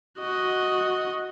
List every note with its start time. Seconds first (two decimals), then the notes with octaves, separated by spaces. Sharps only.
0.19 F#4 D#5